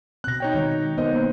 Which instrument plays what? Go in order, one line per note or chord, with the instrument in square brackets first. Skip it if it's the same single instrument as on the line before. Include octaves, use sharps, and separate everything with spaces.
[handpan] B2 C4 [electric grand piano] F#6 A#6
[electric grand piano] D#4 C#5 G5
[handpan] D#3 G#3
[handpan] B3 A#4 C5 [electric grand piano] D#4 D#5
[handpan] A#3